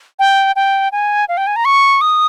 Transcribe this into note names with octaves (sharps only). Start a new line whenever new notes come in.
G5
G5
G#5
F5
G5
G#5
A#5
C#6
D#6